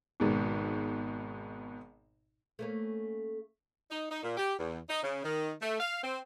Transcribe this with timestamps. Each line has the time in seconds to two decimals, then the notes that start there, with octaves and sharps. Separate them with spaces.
0.20 G#1 G#2 B2
2.59 A3 A#3 C#4
3.90 D#4
4.11 D#4
4.23 A#2
4.37 G4
4.58 E2
4.89 D#4
5.03 C#3
5.24 D#3
5.60 A3
5.80 F5
6.03 C4